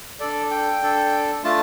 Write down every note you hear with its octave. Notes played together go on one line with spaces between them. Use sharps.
D4 A4 D5
G5
D4 A4
A3 D4 F4 A5